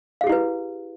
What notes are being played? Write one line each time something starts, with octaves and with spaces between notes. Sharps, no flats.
E4 G4 G#4 B4 F5